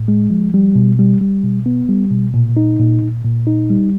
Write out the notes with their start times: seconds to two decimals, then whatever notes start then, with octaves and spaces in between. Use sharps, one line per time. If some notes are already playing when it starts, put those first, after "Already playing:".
Already playing: A2
0.08 G#3
0.30 F3
0.54 G3
0.75 B2
0.99 G3
1.21 G3
1.44 B2
1.66 B3
1.89 G3
2.11 B2
2.34 A#2
2.57 D#4
2.79 A#2
3.02 A#2
3.24 A#2
3.47 D#4
3.70 G3